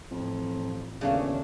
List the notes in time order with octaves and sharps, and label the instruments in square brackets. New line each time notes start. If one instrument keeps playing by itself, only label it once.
[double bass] A1 [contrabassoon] F2
[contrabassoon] G1 [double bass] D#2 D4 [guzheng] C#3 A3 C#4